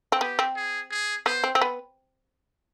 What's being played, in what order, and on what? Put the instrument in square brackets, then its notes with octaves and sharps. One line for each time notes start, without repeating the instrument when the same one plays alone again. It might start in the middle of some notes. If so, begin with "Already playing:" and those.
[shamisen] C4
[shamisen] B3 [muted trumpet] G4
[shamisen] C4
[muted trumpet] G#4
G#4
[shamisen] B3 [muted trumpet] C5
[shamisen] C4
C4
B3